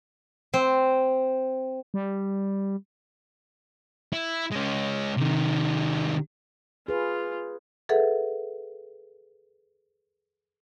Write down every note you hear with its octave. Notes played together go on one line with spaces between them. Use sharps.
C4
G3
E4
G#3 C#4
C3 D#3
F4 G#4 B4
G#4 A4 B4 E5 F#5